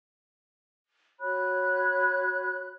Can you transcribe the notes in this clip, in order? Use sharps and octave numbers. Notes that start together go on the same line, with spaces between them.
F#4 C#5 B5 F#6